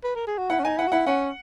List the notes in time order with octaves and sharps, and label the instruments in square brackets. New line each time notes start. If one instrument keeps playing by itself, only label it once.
[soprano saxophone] B4
A#4
G#4
F#4
[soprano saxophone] E4 [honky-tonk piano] F#5
[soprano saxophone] C#4
[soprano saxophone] D#4 [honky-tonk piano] G#5
[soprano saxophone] E4 [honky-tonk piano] F#5
[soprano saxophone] F#4
[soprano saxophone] E4 [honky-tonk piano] F#5
[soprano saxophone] C#4 [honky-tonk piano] F#5